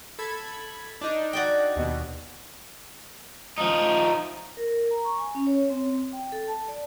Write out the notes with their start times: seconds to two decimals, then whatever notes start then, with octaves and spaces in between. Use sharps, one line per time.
0.19 A4 B5 G#6
1.01 D4 D#4
1.33 F#4 D5 G5
1.76 D#2 B2
3.58 F3 D#4
4.57 A#4
4.91 A#5
5.04 C#6
5.18 G#5
5.35 C#4
5.47 C#5
5.70 C4
6.13 G5
6.32 A4
6.47 A5
6.68 D5